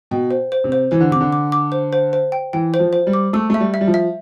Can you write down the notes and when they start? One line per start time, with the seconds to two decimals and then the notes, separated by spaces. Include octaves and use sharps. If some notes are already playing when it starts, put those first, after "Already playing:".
0.11 B2 G5
0.31 C5
0.52 C5
0.64 C3
0.72 C5
0.91 E3 C5
1.01 D3
1.11 C3 D6
1.21 D3
1.32 D6
1.52 D6
1.72 C5
1.93 C5
2.13 C5
2.32 G5
2.53 E3 G5
2.74 C5
2.80 F3
2.93 C5
3.07 G3
3.13 D6
3.33 A3 E6
3.50 A3 E5
3.60 G3
3.74 E5
3.81 G3
3.87 F3
3.94 E5